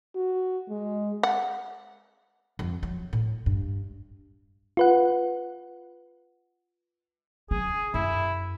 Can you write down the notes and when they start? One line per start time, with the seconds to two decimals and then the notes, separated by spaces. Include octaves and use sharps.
0.16 F#4
0.70 G#3
1.23 F#5
2.59 F2
2.83 F#3
3.13 A2
3.46 G2
4.77 F4 B4 F#5
7.51 F#3 C#4 G#4
7.94 F#2 E4